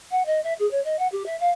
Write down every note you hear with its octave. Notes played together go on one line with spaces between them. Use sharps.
F#5
D#5
E5
G#4
C#5
D#5
F#5
G4
E5
F5